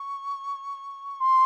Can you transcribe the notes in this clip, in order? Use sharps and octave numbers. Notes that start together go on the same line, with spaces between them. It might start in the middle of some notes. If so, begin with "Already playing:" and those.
Already playing: C#6
C6